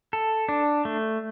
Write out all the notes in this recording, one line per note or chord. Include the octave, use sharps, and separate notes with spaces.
A4
D4
A3